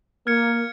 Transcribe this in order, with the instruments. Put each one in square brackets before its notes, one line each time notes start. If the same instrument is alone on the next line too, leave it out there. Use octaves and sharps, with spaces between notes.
[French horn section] A#3 [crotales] F6 G#6 C#7